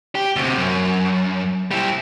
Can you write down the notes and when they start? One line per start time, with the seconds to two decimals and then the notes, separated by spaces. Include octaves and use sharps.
0.15 G4
0.36 D2 C3
0.58 F#2
1.71 G3 E4